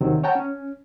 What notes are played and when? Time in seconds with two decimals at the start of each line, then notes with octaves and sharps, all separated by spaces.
0.01 D#2 C3 D#3 F#3 C4
0.24 C#5 F#5 G5 A5 A#5
0.35 C#4